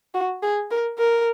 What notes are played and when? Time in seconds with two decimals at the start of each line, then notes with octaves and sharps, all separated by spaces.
0.14 F#4
0.42 G#4
0.71 A#4
0.99 A#4